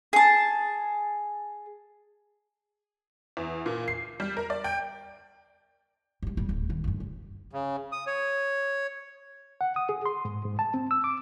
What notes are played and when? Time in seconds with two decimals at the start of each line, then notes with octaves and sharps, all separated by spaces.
0.13 G#4 A5
3.37 E2
3.66 A#2
3.88 C7
4.20 G3
4.37 A#4
4.50 D5
4.64 G5
6.23 G2 G#3
6.37 D#1 G3
6.49 D1
6.69 D#3 E3
6.84 D2 G2
7.00 C2
7.52 C#3
7.92 D#6
8.07 C#5
9.61 F#5
9.76 D#6
9.89 G#4
10.06 C6
10.25 G#2
10.45 G#2
10.59 A5
10.74 C4
10.91 E6
11.04 D6